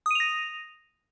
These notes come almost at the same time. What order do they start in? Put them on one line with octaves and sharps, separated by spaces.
D#6 D#7 F7 A#6